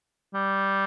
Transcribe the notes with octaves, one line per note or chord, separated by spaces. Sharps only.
G3